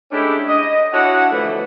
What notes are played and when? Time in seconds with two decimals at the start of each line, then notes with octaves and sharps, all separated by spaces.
0.12 G#3 A3 C#4 D4 E4 G4
0.47 D#5
0.93 D4 E4 F#4 C#5 F#5
1.32 D3 E3 F3 A3 B3